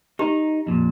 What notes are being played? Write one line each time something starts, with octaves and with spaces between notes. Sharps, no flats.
D#4 G4 A#5
F2 A#2